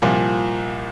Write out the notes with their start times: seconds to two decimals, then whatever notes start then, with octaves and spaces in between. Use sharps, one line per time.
0.02 C2 A#2 F3